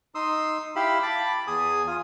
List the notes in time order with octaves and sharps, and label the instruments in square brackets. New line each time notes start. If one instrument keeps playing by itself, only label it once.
[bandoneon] D#4 C6 D#6 E6
E4 G4 F5 B5 E6
A5 B5 D6
E2 G#4 G#5 D#6
F4 G#5